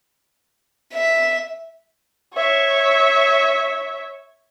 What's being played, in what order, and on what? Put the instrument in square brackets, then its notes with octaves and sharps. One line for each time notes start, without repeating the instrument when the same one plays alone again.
[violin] E5
[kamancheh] C#5 E5